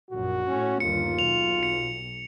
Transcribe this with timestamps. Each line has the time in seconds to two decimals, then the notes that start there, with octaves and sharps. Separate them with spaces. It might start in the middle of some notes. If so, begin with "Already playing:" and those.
0.11 A#1 F#2 F#4
0.48 A2 C#4
0.80 G1 D#2 F4 C#7
1.19 B1 F7
1.63 C#7